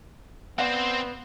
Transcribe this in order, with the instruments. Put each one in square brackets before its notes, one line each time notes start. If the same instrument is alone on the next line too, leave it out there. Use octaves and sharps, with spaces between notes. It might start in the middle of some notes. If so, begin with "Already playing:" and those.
[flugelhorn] B3 [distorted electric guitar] C4 C5 [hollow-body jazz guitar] D5 F5 F#5